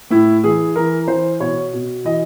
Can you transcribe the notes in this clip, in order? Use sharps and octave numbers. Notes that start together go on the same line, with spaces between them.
A2 E4
E3 G#4
E3 A#4
E3 C5
B2 C#5
B2
E3 D#5